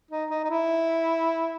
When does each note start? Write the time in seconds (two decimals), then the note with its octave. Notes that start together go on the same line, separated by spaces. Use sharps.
0.11 D#4
0.31 D#4
0.44 D#4
0.50 E4